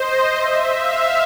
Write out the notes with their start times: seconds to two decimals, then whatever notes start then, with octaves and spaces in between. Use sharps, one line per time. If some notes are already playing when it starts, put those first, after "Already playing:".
Already playing: C5 D#5
0.33 E5
0.75 F5